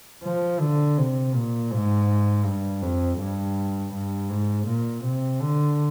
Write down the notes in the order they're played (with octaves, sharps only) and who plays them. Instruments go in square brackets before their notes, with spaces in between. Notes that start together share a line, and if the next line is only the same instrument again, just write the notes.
[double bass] F3
D3
C3
A#2
G#2
G2
F2
G2
G2
G#2
A#2
C3
D3